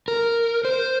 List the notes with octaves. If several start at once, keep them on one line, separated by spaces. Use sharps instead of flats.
A#4
C5